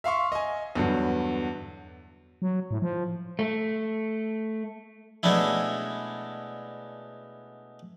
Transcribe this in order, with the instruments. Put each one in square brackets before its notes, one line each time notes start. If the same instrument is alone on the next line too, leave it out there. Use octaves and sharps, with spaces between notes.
[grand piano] E5 F5 C6 C#6
D#5 G#5
E2 G2 D3 F#3
[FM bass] F#3
A2
F3
[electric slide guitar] A3
[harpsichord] B2 G#3 A3 C#4 D4 E4